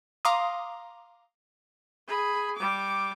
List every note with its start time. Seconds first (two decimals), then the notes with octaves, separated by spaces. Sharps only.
0.25 F5 A#5 C6 D6 D#6
2.07 G#4 B5
2.56 G3 D6